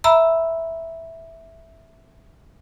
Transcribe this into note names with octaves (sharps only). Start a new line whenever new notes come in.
E5 A#5 B5 E6